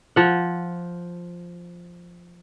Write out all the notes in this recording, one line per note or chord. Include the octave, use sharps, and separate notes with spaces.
F3 F#5